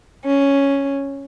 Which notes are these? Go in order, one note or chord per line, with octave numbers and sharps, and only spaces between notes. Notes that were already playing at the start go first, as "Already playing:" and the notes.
C#4